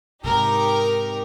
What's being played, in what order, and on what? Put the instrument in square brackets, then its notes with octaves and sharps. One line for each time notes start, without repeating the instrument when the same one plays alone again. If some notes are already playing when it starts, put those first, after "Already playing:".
[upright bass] G#2 C3 [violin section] D#4 G4 A#4